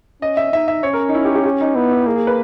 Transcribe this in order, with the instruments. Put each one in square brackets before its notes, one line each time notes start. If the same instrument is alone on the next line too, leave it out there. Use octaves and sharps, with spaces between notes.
[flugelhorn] C#4 [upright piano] D#5
[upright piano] E5
[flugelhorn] D#4 [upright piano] E5
[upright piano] E5
[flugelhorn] C#4 [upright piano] C#5
[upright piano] A#4
D#4
E4
G4
G4
G4
D#4
[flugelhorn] B3 [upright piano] E4
[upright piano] E4
[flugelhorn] A#3 [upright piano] G#4
[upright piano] G#4
B4